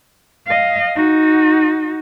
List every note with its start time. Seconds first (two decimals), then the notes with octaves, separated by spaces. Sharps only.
0.46 D#5 F5
0.96 D#4 F#4